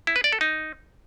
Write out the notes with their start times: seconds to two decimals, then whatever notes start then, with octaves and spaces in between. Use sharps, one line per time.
0.07 E4
0.16 B4
0.24 D5
0.32 A4
0.41 D#4